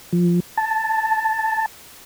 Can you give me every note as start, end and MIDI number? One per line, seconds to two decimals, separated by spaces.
0.13 0.40 53
0.57 1.66 81